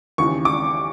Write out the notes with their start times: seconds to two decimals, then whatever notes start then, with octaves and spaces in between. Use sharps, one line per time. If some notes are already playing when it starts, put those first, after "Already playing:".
0.18 D#2 C#3 E3 C#6
0.45 D6